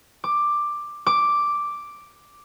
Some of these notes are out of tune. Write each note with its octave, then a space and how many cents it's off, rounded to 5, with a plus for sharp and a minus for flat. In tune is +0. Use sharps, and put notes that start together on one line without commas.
D6 +10
D6 +0